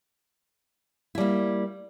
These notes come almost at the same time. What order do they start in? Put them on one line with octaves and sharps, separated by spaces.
E4 G3 A#3